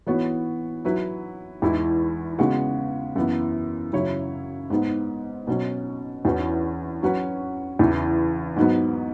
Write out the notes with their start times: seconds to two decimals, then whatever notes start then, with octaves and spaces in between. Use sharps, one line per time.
0.07 E3 B3 F#4 C#5
0.85 F#3 E4 B4
1.62 E2 E3 G#3 E4
2.39 C#3 G#3 B3 F#4
3.16 F#2 E3 B3
3.93 F#2 C#3 F#3 E4 C#5
4.70 G#2 G#3 B3
5.47 B2 F#3 C#4
6.25 E2 E3 C#4 F#4 B4
7.02 F#3 C#4 F#4 B4
7.79 E2 C#3 E3
8.56 G#2 F#3 B3